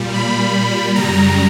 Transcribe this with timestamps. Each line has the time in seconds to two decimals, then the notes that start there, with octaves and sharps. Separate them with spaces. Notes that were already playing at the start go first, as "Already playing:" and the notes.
Already playing: A#2 G3
0.14 B5
0.95 F#2 C#3 G3 A#5